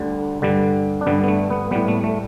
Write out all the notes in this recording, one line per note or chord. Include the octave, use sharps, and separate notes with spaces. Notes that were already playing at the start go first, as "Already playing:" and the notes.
Already playing: D2 D3 G3
G2 D3 G3
D4
G2 D3 G3 B3
B3
A3
B3
A2 G3 B3
A3
A3